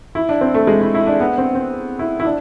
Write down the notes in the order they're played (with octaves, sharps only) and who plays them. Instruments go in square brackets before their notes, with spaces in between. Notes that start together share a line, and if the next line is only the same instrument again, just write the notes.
[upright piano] E4
D4
C4
A3
G#3
E4
E4
D4
B3
C4
C4
E4
E4
D4